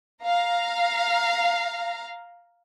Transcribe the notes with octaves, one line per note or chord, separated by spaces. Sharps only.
F5 A#5